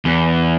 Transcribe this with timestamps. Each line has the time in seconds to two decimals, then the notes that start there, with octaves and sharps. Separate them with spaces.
0.05 E2